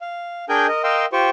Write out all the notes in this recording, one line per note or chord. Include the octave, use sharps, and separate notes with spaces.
F5
D4 G#4 A#4 G5 G#5 G6
A#4 D#5
A#4 D#5 F5 G5 C6 E6
F4 G4 C5 G5 C#6